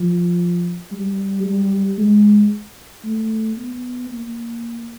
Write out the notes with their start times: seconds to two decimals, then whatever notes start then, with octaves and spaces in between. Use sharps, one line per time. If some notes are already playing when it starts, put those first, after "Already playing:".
Already playing: F3
0.91 G3
1.44 G3
1.98 G#3
3.04 A3
3.58 B3
4.10 A#3